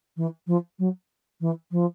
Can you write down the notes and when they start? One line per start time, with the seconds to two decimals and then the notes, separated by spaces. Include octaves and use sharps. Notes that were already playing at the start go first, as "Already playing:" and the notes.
0.17 E3
0.47 F3
0.79 F#3
1.41 E3
1.71 F3